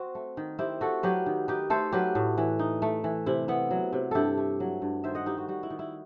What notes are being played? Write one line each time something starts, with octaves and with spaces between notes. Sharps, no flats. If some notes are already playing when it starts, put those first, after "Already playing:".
Already playing: C4 F#4
A3
D#3
C4 E4 G4
A3 F#4 A4
F#3 G4 B4
D#3
D#4 G4 B4
A3 A4 C5
F#3 G4 B4
A2
E3
D#4
A3
E3
C3 E4
B3 E4
F#3
C3
G2 E4 G4 A4
A3
F#3
G2
D#3 C5 E5
D#5 F#5
D#4 E4 G4
F#4
G3 F#4
E4
D#3
E4